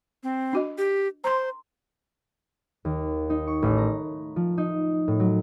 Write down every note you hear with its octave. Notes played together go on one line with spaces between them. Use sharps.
C4
D4 F#4 D#5
G4
C5 A#5 C6
D#2
D#4
C#6
A1
A#5
F3
D#4
A2
F#3